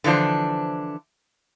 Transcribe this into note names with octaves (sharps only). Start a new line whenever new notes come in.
D3 E3 F3 D4 C5